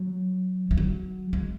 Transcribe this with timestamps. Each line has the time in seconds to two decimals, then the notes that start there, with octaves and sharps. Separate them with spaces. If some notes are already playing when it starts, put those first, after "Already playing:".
Already playing: F#3
0.71 E3
0.77 F#3
1.33 G#3